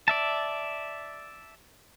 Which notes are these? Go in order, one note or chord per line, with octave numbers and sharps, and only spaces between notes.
D5 E5 A5